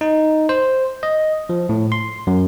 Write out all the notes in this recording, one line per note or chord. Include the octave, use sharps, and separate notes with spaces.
D#4
C5
D#5
F3
A2
C6
F#2